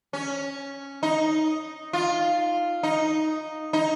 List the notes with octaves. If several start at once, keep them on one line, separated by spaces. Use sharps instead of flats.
C#4
D#4
F4
D#4
D#4